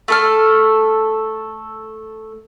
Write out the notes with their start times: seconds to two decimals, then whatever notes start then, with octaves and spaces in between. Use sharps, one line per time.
0.08 A3 A4 F6